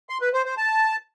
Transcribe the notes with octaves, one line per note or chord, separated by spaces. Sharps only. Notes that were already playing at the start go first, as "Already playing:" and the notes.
C6
B4
C5
C5
A5